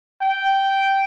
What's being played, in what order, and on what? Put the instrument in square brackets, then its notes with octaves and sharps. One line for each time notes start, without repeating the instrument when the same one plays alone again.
[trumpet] G5